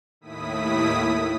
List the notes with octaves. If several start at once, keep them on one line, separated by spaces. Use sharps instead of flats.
D#2 A2 E4 D#6 B6